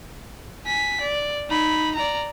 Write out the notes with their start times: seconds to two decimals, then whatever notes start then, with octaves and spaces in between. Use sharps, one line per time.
0.66 G#5 B6
1.01 D5
1.49 D#4 B5
1.95 D5 A#5